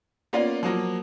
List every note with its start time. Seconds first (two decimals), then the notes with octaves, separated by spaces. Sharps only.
0.33 A#3 B3 C#4 F4 D5
0.63 F3 F#3 A#3